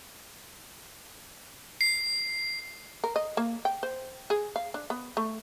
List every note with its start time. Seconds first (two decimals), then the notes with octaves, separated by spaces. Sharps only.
1.81 C7
3.04 A#4
3.16 D#5
3.37 A#3
3.65 G5
3.83 C5
4.30 G#4
4.56 F5
4.74 D4
4.90 B3
5.17 A3